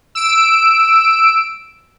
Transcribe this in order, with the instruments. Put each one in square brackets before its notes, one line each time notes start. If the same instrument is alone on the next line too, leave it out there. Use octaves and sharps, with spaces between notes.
[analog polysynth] E6 D7